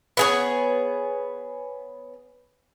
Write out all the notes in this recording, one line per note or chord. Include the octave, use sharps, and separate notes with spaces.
B3 G#4 C#5